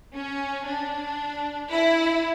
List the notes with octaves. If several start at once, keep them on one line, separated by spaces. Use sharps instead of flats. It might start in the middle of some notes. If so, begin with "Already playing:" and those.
C#4
D4
E4